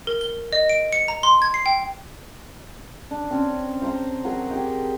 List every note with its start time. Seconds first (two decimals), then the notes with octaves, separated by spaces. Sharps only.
0.07 A#4
0.21 G7
0.53 D#5
0.69 D7
0.93 C#7
1.08 A#5
1.23 C6
1.42 G#6
1.54 C7
1.66 G5
3.11 D4
3.30 C4 C#4
3.82 C5 G5 A#5 C6
4.24 F#3 G#4 A#4
4.51 G4 G#4 G5